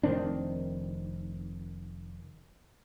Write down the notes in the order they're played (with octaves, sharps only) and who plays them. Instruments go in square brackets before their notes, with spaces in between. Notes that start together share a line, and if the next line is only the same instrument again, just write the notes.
[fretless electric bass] F1 D#3 C4 D4